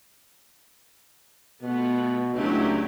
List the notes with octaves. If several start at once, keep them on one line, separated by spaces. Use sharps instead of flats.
B2 A3 B3 F4
C#2 F#3 A3 D4 E4 G4